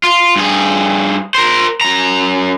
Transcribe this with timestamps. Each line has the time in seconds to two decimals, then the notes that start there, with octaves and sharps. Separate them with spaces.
0.03 F4
0.36 G2 G#4
1.35 A#4 C5
1.81 F#2 A#5